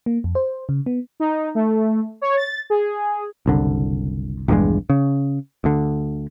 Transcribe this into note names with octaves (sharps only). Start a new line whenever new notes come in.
A#3
F2
C5
C#3
B3
D#4
A3
C#5
A6
G#4
F#1 C2 D3
A#1 E2 G2 G#3
C#3
D2 D3